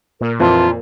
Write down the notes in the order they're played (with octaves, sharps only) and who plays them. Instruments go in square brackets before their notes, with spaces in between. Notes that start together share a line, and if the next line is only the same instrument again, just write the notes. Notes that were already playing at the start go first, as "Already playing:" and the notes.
[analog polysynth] A#2 [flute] A#4
[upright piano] F2 E3 [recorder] F4 [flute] A5